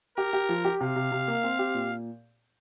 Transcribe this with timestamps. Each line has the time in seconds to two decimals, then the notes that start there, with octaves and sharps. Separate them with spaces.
0.17 G4 A#4
0.33 G4
0.49 F3
0.65 G4
0.81 C3 F5
0.96 C3
1.12 C3
1.28 A#3
1.44 C4
1.59 G4
1.74 A#2